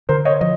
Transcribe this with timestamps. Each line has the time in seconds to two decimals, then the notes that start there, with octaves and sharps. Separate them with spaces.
0.09 D3 A#4 C5
0.25 C#5 D#5
0.41 F3 D#5